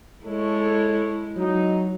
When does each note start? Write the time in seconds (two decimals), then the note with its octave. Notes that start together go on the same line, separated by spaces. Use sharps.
0.25 G#3 E4 A4 C#5
1.37 F#3 D#4